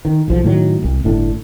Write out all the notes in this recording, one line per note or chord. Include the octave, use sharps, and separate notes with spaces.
D#3
B1 F3
A2 D#3 F#3
C2
G1 A2 D4